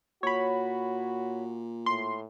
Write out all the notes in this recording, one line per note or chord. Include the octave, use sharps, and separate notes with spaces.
A#2 F#4 C#5 B5
A2 C6